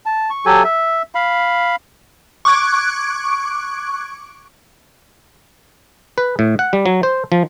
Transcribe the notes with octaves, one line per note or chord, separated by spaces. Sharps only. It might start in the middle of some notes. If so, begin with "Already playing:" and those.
A5
C#6
F#3 G4 A4 G#5
E5
F5 B5
C#6 D6 F#6 G#6 D7
B4
A2
F#5
G3
F#3
C5
F3